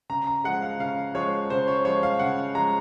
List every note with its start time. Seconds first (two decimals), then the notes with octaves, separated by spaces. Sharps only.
0.10 C#3 A#5
0.27 A#5
0.44 F3 G#3 F#5
0.62 F5
0.79 C#3 F5
1.14 F3 G#3 C#5
1.50 C#3 C5
1.68 C#5
1.85 F3 G#3 C#5
2.03 F5
2.19 C#3 F#5
2.55 F3 G#3 A#5